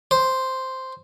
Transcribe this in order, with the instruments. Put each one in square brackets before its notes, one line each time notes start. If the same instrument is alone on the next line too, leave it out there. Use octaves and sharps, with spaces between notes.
[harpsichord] C5